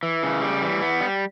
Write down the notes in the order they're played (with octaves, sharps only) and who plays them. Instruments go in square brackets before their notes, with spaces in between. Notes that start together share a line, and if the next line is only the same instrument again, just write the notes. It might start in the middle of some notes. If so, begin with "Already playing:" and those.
[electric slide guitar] E3
C#3
G3
E3
B3
G3